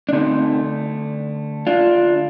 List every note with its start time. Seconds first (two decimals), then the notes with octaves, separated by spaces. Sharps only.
0.09 D4
0.13 D3 A3 C4 D#4
1.67 D4 F4